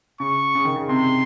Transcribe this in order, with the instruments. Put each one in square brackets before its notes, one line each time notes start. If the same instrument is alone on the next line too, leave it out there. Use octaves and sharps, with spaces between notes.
[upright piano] C#3 [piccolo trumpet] C#6
[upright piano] C#3
D#3
C#3
[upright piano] C3 [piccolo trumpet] C6